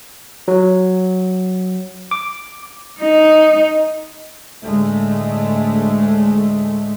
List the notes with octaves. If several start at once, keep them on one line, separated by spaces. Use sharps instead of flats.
F#3
D6
D#4
D2 A2 G#3 A3